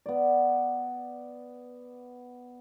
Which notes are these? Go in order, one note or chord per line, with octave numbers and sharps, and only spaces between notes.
B3 D5